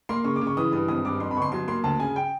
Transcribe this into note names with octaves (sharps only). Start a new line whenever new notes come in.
A#3 C6
C#3 C#6
D6
C#3
C#6
E3 D#6
G2 D#6
G#1 D#6
G2 D6
F2 C6
B5
G1 C#6
C6
F#3 C6
A#3 C6
D2 A5
C#3 G#5
G5